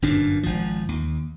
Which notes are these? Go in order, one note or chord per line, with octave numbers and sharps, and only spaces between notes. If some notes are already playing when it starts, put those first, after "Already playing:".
G1 F#2 A#2 D4
G#1 F3
D#2